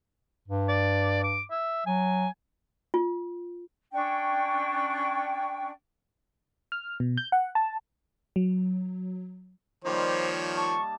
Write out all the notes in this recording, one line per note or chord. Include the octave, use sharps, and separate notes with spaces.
G2
D5
D6
E5
F#3 G#5
F4
C#4 D4 G5 C#6
F6
B2
G6
F#5
A5
F#3
D#3 F3 G3 A#3 D#4 C5 C#5
A5 C#6